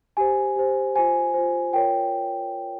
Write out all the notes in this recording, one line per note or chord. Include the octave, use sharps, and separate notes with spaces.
G4 C5 G#5
G4 C5
F4 C5 G#5
F4 C5
F4 A#4 C#5 G5